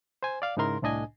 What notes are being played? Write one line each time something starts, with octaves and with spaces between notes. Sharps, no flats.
C5 G#5
D5 F5 D6
G#2 C#3 D#4 E4 A#4 C6
C2 A2 D4 D#5 G#5